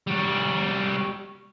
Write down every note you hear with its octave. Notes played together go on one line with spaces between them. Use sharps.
G3 F#4